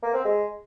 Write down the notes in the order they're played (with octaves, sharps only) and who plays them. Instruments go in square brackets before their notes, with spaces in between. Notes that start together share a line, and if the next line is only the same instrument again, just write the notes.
[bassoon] A#3
C4
G#3